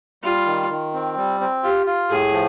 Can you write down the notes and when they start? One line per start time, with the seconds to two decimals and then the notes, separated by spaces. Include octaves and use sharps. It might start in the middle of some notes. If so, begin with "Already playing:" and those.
0.23 G3 F4
0.47 D#3
0.70 D#3
0.94 C4
1.17 G3
1.41 C4
1.63 F4 G4
1.87 F4
2.10 A2 G#4
2.33 F3